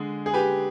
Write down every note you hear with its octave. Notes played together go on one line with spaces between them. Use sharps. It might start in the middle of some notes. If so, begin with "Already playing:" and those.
Already playing: D3 G#3 G#4
G#4
G4 B4